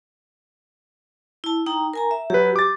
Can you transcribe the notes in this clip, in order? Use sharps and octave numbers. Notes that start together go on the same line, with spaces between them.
E4 A5
D#4 G5 A#5
A#4 G#5 A#5
E5
F#3 G4 B4
D6 A6